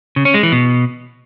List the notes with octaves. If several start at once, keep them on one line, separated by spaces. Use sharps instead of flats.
C#3
C#4
G#3
E3
B2